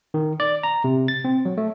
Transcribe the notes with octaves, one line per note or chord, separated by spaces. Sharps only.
D#3
D5
A#5
C3
A6
C4
F#3
A3